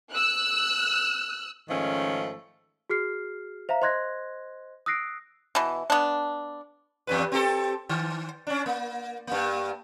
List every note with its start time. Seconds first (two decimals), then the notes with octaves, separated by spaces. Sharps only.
0.12 E6 F#6
1.69 G#2 D#3 F3 A3 C#4
2.90 F#4 G#4 F6 C7
3.69 C5 E5 F5 A#5
3.82 C5 D#5 C6 F#6 G#6 A#6
4.86 D#6 E6 F#6 A#6 C7 D7
5.55 B2 E3
5.90 B3 D4
7.07 E2 G2 B4
7.32 C4 G4 A4
7.89 D#3
8.47 C#4 D4
8.66 A#3
9.27 G2 A#3